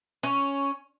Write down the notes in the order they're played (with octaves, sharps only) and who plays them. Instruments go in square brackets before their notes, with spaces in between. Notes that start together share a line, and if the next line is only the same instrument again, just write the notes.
[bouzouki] C#4